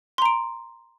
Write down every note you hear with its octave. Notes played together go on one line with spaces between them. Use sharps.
A#5 C6 D7